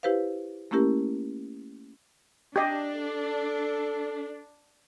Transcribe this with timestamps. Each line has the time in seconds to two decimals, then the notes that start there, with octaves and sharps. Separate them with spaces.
0.03 E4 G4 B4 C5 F5
0.71 A3 A#3 C#4 E4 G4 A#4
2.56 D4 G4 D#5
2.95 A4